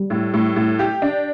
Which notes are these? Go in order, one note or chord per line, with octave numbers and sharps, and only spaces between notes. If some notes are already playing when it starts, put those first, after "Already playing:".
Already playing: G3
A2
A2
A2
G4
D4